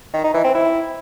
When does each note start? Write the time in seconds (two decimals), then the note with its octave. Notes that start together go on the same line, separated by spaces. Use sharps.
0.14 D#3
0.24 D#4
0.34 E3
0.44 C4
0.54 E4